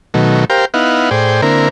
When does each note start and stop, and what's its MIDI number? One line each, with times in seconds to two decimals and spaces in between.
0.14 0.45 47
0.14 0.45 51
0.14 0.45 54
0.14 0.45 57
0.50 0.65 67
0.50 0.65 70
0.50 0.65 72
0.50 0.65 77
0.50 0.65 79
0.74 1.10 59
0.74 1.10 63
0.74 1.10 64
0.74 1.10 77
0.74 1.10 78
1.11 1.41 45
1.11 1.41 68
1.11 1.41 72
1.11 1.41 74
1.11 1.41 79
1.42 1.69 50
1.42 1.69 58
1.42 1.69 60
1.42 1.69 64
1.42 1.69 70